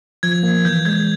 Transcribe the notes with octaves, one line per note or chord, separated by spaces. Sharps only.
F3 G#6
A#3
E3 G6
G#3 G#6